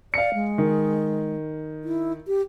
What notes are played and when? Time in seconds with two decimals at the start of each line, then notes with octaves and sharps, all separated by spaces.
0.14 D5 F5 C#7
0.34 G#3
0.58 D#3
1.84 E4
2.27 G4